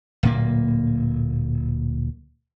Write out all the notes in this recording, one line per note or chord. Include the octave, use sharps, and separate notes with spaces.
D1 A#2 A#3